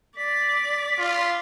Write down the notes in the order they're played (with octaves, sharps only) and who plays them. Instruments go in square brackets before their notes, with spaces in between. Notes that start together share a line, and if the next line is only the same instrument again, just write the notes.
[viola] D5 [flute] B6
[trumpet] F4